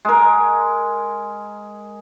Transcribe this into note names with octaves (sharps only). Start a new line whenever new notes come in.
G#3 A#4